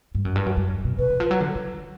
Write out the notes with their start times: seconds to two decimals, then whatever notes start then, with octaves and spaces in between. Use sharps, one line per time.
0.15 G2
0.25 F#2
0.36 G2
0.46 F#2
0.57 F#2
0.85 B2
0.98 C3 B4
1.10 E3
1.20 F3
1.31 F#3
1.40 D3
1.55 C#3